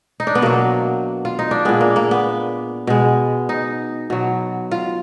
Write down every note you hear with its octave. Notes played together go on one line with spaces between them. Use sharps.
D#4
D4
B3
B2 F#3 A#3
F4
D#4
D4
A#2 G#3 B3
A#3
A#3
B3
B2 G#3
D#4
B2 F#3
F4